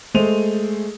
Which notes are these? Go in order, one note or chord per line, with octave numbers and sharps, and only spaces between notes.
G#3 A3 C5 D#7 F7